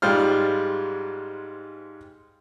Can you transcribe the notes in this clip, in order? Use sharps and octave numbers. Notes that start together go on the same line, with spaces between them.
G#2 G3 G#3 F4 C5 F6